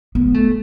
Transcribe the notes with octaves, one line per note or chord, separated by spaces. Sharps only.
B3
A3